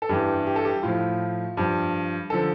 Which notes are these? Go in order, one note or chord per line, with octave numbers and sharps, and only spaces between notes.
A4
G2 E3 G4
G4
A4
G4
A2 F3 F4
G2 F3
D3 F3 A4